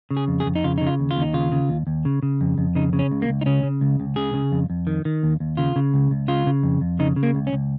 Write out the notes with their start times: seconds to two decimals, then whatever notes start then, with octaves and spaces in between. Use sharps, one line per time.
0.11 C#3
0.17 G#4
0.28 F2
0.40 G#4
0.46 F2
0.55 D#4
0.64 C#3 F4
0.78 C#3 D#4
0.87 F4
1.00 D#2
1.11 F4
1.16 D#2
1.22 D#4
1.34 C#3 F4
1.52 C#3
1.69 D#2
1.87 D#2
2.05 C#3
2.23 C#3
2.41 F2
2.58 F2
2.75 C#3 D#4
2.93 C#3
2.99 C#4
3.11 C#2
3.22 A#3
3.29 C#2
3.41 D#4
3.46 C#3 C#4
3.63 C#3
3.81 C#2
4.00 C#2
4.16 C#3 G#4
4.34 C#3
4.52 F2
4.70 F2
4.87 D#3
5.05 D#3
5.23 D#2
5.40 D#2
5.57 C#3 F4
5.76 C#3
5.94 C#2
6.11 C#2
6.28 C#3 F4
6.47 C#3
6.63 F2
6.81 F2
6.99 C#3 D#4
7.16 C#3
7.23 A#3
7.35 C#2
7.47 C#4
7.53 C#2